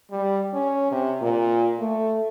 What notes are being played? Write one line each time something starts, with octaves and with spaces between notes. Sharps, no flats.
G3
C#4
C3
A#2
A3